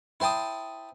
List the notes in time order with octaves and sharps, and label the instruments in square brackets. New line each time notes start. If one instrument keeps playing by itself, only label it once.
[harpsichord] E4 C5 G5 A5 D#6